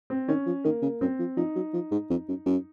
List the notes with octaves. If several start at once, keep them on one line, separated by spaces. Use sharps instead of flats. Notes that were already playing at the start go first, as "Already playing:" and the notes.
C4
D#3 C#4
F3
D#3 A#3
C#3
F#2 C4
F3
F3 D#4
F#3
F3
G#2
F2
F#2
F#2